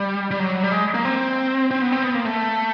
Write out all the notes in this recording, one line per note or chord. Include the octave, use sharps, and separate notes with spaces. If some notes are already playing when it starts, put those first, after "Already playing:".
Already playing: G3
G3
F#3
G3
G#3
A#3
C4
C4
B3
C4
B3
A#3
A3